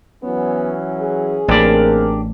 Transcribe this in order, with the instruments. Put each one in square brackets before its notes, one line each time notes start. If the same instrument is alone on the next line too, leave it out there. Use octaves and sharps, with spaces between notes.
[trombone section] E3 F#3 C#4 [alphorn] B3
[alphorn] G#4
[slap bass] A1 [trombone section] A#3 C4 A#4 [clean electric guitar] D4 G4 D5